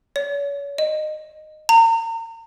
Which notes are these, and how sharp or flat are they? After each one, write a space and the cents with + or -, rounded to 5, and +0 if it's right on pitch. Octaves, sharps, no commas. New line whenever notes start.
C#5 +35
D#5 -15
A#5 -40